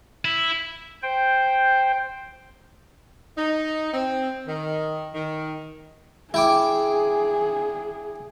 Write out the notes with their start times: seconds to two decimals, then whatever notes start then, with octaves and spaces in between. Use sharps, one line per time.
0.25 E4
1.03 C5 G5
3.37 D#4
3.94 C4
4.47 D#3
5.14 D#3
6.34 E4 G#4 G5 D6